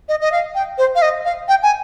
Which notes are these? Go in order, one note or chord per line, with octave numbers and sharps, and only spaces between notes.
D#5
D#5
F5
G5
C5
F5
D#5
F5
G5
G#5